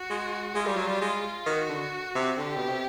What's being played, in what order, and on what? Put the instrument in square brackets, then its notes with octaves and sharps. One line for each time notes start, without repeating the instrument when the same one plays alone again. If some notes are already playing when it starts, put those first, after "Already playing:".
Already playing: [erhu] F#4
[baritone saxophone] G#3
[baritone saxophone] G#3 [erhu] F4
[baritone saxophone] G3
F#3
G3
G#3
[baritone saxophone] D#3 [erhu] F#4
[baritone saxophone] D3
C3
[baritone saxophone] D3 [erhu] G4
[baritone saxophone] B2
C3